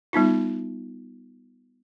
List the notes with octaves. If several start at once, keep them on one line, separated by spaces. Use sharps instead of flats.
G3 B3 D#4 F4